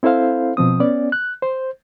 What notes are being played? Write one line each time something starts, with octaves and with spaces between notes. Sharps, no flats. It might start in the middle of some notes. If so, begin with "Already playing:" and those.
C4 E4 A4 C5 F5
B2 F3 C4 D#6
B3 C#4 D5
F#6
C5